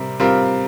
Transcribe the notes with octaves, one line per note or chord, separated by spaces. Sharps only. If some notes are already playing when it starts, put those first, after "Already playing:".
Already playing: C3 G3 C4 A#4
G3 C4 F4 A#4